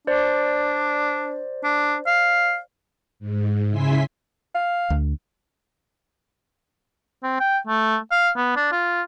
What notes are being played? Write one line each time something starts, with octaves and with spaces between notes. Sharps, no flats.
D4 C5 D5
D4
F5
G#2
C#3 E4 E5 G#5 C6 B6
F5
D2
C4
G5
A3
F5
B3
D4
F4